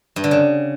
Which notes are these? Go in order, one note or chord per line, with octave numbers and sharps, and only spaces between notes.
G2
D3
C#3